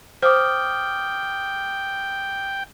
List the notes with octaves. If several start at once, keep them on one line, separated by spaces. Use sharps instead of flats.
C5 G5 D6 D#6 F6